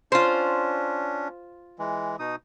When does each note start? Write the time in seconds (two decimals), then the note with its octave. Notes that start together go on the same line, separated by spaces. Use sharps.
0.12 C#4 D4 F4 C5
1.79 E3 G#3
2.19 B2 D#4 D#6